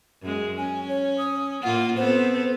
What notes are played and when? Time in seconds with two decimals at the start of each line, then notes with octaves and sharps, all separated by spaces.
0.23 F#2 G#3
0.58 C#4 G#5
0.89 C#5
1.18 D#6
1.63 A2 A#3 F4 F#5
1.97 B3 C4 A4 C5